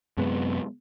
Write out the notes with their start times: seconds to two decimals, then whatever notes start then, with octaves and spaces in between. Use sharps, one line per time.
0.17 F#2 C3 G#3 B3